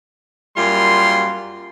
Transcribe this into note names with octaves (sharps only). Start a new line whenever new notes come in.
F#2 G3 A#3 F4 C6